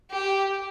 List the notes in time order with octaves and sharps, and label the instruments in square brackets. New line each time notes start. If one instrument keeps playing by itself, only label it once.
[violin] G4